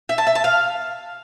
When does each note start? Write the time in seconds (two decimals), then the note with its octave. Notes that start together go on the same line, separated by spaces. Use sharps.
0.09 E5
0.18 A5
0.27 E5
0.35 A5
0.44 F5